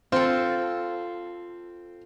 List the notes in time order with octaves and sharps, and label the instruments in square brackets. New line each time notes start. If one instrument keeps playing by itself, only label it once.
[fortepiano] C4 [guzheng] F4 A4